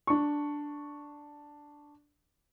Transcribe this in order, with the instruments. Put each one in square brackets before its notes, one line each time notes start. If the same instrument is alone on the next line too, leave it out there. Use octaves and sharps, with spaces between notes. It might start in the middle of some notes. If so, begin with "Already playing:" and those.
[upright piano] D4 C#6